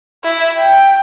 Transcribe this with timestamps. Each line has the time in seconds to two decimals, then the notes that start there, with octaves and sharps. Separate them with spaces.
0.24 E4
0.59 G5